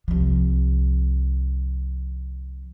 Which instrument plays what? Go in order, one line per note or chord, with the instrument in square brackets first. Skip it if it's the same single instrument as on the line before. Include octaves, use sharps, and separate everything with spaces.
[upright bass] C2 F3